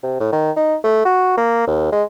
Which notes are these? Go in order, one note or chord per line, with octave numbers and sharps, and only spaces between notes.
C3
A2
D#3
D#4
A3
F#4
A#3
D#2
G#3